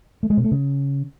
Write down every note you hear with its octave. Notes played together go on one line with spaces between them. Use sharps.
A3
G#3
B2
A3
C#3